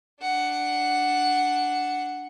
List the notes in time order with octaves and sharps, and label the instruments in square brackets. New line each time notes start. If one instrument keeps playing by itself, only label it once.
[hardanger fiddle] D4 F#5